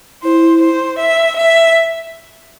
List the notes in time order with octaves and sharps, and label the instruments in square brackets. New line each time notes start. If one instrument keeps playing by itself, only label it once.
[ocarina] E4 [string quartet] C5
[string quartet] C5
E5
E5